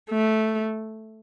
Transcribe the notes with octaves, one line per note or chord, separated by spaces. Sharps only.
A3